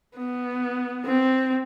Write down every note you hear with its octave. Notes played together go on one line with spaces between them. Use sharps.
B3
C4